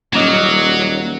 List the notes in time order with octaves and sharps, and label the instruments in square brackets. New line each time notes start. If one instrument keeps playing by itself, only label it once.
[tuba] D#1 [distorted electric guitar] F#3 [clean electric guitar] A#3 C#4 D#5